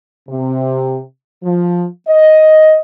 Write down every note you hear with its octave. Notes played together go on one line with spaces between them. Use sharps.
C3
F3
D#5